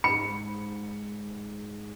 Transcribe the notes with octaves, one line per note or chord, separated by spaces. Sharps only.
G#2 B5 C#7